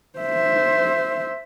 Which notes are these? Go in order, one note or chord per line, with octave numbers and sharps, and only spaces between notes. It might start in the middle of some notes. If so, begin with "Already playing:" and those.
C5 E5